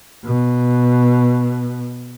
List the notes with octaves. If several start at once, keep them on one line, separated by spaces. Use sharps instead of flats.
B2